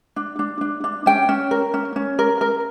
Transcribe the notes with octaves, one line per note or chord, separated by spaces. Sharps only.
D4
D4
D4
D4
C#4 G5
C#4
A#4
C#4
C#4
A#4
A#4